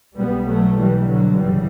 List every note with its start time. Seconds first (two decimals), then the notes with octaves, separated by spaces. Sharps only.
0.17 B1 B2 G3 B3
0.47 F#3 A3
0.77 E3 G3
1.06 D3 F#3
1.36 G1 F#2 C#3 E3 G3